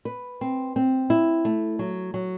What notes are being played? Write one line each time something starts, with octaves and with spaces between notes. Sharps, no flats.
B4
C4
C4
E4
A3
F#3
F#3